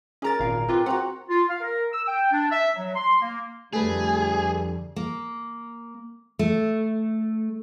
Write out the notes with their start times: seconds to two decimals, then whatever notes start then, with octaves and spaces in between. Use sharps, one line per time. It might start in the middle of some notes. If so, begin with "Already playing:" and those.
0.22 C#4 G#4 A#4 A#5 A6
0.40 G#1 A#2 F5
0.68 C4 F4 G4 B4
0.86 C4 F#4 F#5 A#5
1.29 F4
1.48 F5
1.61 A#4
1.93 E6
2.07 G5
2.32 D4
2.50 E5
2.76 F#3
2.95 C6
3.21 A#3
3.73 F2 D3 G3 A3 G#4 B4
4.96 A#3
6.39 A3